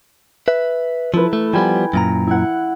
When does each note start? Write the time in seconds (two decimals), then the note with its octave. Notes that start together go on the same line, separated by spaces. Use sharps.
0.48 B4 E5
1.14 F3 E4 A4 B4
1.33 A3
1.54 F3 G3 B3 G5 G#5 B5
1.93 F#2 A#2 A#5
2.27 E4 F#5